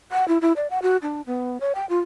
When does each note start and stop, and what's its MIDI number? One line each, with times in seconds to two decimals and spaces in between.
0.12 0.27 78
0.28 0.38 64
0.41 0.52 64
0.56 0.67 74
0.70 0.79 78
0.82 0.97 66
1.02 1.22 62
1.26 1.58 59
1.61 1.73 73
1.75 1.86 79
1.89 2.00 65